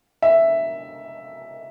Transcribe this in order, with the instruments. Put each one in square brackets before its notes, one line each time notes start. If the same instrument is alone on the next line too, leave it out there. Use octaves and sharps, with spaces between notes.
[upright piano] E5